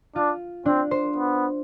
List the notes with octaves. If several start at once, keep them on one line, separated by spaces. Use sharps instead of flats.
D4 F4
C4 D4
C5
B3